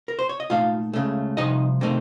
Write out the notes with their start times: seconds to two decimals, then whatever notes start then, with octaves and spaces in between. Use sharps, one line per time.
0.08 A#4
0.19 C5
0.29 C#5
0.40 D#5
0.50 A#2 A3 D#4 F4 F5
0.93 C#2 C#3 A3
1.37 C2 C3 F3 D#4 D#5
1.81 C3 D#3 A3 C4 D#4